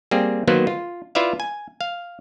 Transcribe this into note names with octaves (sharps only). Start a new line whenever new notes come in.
G3 A#3 C4 G#4
D#3 F#3 A#3 B3 B4 C5
F4
E4 F4 B4 D5 E5 F5
G#5
F5